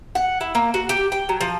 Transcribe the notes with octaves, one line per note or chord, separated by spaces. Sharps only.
F#5
E4
A#3
F#4
G4
G5
F#3
F3